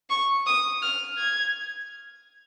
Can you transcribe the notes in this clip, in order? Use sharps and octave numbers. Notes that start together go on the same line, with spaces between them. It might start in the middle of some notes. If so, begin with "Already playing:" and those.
C#6
D#6
F6
G#6